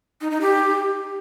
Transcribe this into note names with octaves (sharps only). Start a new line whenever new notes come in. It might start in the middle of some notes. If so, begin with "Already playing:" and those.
D#4
D#4
G4